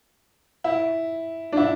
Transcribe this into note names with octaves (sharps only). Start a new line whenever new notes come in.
E4
D4
E4